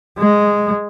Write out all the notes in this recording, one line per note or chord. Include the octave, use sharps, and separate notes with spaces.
G#3